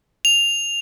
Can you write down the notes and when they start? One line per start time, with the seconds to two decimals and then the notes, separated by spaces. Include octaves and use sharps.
0.25 F7